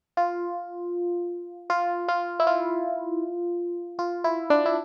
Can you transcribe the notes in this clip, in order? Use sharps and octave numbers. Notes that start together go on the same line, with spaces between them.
F4
F4
F4
E4
F4
F4
E4
D4
E4